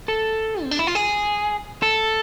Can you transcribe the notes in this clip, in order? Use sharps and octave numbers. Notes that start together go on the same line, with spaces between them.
A4
C4
D4
E4
F4
G#4
A4